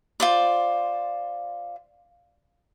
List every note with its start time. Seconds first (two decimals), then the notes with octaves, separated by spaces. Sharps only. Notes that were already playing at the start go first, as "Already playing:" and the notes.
0.20 F4 C5 D5